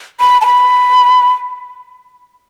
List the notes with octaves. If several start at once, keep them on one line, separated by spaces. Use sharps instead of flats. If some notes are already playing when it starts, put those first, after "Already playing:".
B5
A5
B5